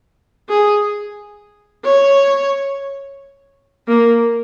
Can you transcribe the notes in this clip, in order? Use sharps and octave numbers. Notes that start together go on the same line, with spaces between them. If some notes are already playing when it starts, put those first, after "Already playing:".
G#4
C#5
A#3